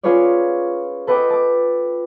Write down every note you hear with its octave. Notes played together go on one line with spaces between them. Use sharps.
C#4 F4 G#4 B4 C#5 D5
A4 B4 D#5 G5 D6
A5 D6